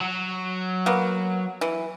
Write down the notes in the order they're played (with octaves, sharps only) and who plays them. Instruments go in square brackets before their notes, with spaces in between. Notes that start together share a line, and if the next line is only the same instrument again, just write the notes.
[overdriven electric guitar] F#3
[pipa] A#3 B3
E3